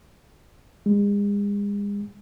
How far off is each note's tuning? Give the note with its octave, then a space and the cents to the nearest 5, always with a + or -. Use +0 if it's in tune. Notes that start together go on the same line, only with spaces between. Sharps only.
G#3 -40